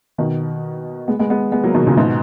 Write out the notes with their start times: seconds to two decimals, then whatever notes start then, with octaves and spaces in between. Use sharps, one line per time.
0.18 B2 D#3
1.08 G#3 B3
1.19 G#3 B3
1.30 G#3 B3
1.52 G#3 B3
1.64 F#3 A#3
1.75 B2 D#3
1.87 A#2 C#3
1.97 G#2 B2